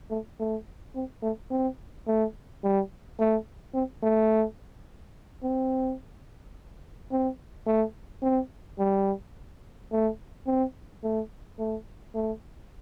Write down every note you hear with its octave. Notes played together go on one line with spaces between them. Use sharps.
A3
A3
C4
A3
C4
A3
G3
A3
C4
A3
C4
C4
A3
C4
G3
A3
C4
A3
A3
A3